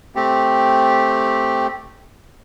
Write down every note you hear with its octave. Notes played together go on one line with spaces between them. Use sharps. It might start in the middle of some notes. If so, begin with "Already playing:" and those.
A3 C4 G4